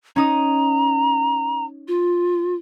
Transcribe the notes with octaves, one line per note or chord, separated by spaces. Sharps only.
C#4 D#4 A#5 D#6
F4